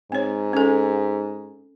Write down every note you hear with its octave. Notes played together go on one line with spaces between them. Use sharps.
G#2 C4 C#5
C#4 A4